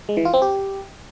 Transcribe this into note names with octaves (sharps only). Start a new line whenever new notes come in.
G#3
E3
F4
C4
G4